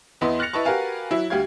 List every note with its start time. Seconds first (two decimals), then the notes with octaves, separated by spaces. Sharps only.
0.21 E2 B3 E4 B4 D#5 C6
0.39 F6 F#6 A6 A#6 C#7 F7
0.53 E4 B4 D#5 A5 C#6
0.65 F#4 G4 A#4 B4 F5 G#5
1.11 F#3 E4
1.30 D2 G3 G4 F5 G#6